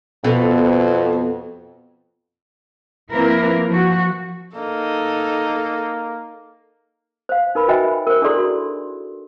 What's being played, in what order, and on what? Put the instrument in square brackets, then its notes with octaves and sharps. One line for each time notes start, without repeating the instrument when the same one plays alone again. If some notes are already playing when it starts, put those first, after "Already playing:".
[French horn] F2 [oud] B2 [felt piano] B3 A4
[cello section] F3 A#3 C4 E4 A#4 B4
F3 F#4
[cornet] A#3 [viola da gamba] D#4 A4
[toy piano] C5 F5
D#4 A#4 B4 B5
F#4 C5 D#5 E5 G5 G#5
A#4 C5
D4 E4 G#4 A4 D5 C6
F#4